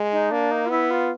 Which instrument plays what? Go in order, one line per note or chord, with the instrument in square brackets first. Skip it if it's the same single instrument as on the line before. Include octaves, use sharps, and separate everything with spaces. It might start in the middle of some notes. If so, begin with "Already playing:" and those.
Already playing: [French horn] G#3
[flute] D#4
[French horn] A#3 [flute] D4
[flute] D#4
F4
[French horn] B3 [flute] E4
[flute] F4